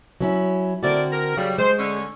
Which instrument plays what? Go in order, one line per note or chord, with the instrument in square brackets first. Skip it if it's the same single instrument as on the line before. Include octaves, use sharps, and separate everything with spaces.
[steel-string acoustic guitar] F#3 C#4 E4
[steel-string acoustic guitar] D3 C4 F#4 [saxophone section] E4 A#4 D5
[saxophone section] A#4
[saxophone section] C#3 G3 [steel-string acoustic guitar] F#3
[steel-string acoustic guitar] G#3 [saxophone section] C5
[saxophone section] D3 C#4